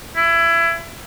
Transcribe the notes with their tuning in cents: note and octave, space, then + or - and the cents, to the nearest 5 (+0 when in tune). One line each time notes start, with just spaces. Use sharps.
E4 +25